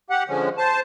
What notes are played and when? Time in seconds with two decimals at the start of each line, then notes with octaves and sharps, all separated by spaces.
0.10 G4 F#5
0.28 D3 F3 G#3 C#4
0.58 C5 A5